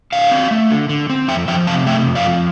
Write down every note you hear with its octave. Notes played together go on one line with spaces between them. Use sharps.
D3 D5 F5
C4
A3
D3
D3
C4
F2 E5 G5
F3 E5 G5
C3 F5 A5
A3 E5 G5
F2
D5 F5
F3